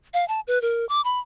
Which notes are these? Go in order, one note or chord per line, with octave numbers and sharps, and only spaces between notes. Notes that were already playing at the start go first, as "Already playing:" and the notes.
F5
A5
B4
A#4
D6
B5